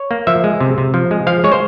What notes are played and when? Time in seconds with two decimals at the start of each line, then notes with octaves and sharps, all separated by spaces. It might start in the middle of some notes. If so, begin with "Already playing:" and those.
Already playing: C#5
0.11 A#3
0.27 F3 E5
0.44 G#3
0.60 C3
0.78 C3
0.94 F3
1.11 G#3
1.27 F3 F5
1.44 G#3 C#5
1.52 C5